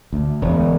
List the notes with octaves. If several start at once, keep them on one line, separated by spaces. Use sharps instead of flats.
D2
E1